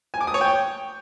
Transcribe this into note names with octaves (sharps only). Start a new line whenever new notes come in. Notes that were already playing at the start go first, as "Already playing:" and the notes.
G#5
D6
D#6
C#5
G5